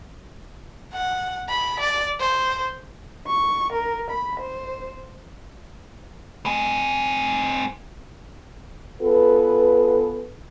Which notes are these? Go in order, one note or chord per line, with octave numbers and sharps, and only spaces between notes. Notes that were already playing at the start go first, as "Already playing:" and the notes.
F#5
B5
D5
C5
C#6
A#4
B5
C5
C4 G#4
B3 F4 G#4 A4 B4